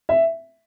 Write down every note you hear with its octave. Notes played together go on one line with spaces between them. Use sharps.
E5